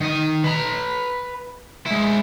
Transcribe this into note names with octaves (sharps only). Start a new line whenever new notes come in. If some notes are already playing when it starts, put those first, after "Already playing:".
D#3 D#5
B4 A#5
G#3 E4